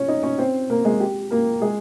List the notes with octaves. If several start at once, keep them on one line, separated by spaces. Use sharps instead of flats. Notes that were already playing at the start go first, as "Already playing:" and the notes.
Already playing: C#4 C#5
D#4 D#5
C#4 C#5
C4 C5
A#3 A#4
G#3 G#4
G4
A#3 A#4
G#3 G#4